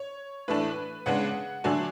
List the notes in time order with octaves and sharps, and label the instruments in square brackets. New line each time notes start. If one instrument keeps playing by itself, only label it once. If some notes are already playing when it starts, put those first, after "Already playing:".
Already playing: [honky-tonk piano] C#5
A2 E3 A3 D4 B4
C#3 G#3 B3 D4 F#5
D3 F#3 A3 D4 G#5